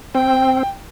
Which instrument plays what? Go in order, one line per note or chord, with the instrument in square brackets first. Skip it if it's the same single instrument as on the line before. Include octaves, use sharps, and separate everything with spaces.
[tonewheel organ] C4 [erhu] G5